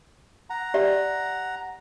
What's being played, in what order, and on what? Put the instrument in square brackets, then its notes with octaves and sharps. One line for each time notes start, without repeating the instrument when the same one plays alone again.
[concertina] F#5 A#5
[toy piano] G4 D5 E5